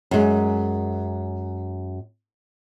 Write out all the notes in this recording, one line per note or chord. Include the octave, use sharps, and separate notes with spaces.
F#2 G#3